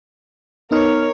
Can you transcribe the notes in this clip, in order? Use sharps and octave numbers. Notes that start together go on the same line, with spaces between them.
B3 D#4 A#4 C#5 F6